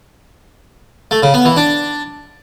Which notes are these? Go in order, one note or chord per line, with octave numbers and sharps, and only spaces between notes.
A3
C#3
B3
E3
D4